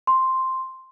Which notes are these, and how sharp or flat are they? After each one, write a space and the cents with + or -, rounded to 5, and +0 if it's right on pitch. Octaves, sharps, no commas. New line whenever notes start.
C6 +0